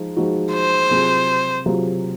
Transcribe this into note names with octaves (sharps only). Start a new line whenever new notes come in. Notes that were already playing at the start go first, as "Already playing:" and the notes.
Already playing: F3 G#3 D#4
F3 G#3 D#4 F#4
C5
C3 F#3 C4 F4 G#4
C3 F#3 C4 F4 G#4